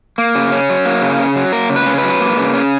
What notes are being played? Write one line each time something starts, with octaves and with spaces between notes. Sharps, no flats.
A#3
C#3
C#4
F#3
A#3
C#3
C#4
F#3
A#3 A#4
C#3
B4
C#4
F#3 B4
A#3
C#3
C#4